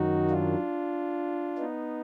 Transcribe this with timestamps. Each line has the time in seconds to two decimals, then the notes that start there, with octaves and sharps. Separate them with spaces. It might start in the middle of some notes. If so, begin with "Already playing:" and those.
Already playing: F#2 D#3 F#3 D#4 F#4
0.30 D4 F4
1.58 B3 D#4